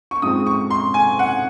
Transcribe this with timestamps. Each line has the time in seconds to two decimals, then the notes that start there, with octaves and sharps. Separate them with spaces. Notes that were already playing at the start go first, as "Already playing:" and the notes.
0.11 C#6
0.22 G#2 F3 G#3 C4 D#6
0.47 C#6
0.70 C6
0.94 G#5
1.19 F#5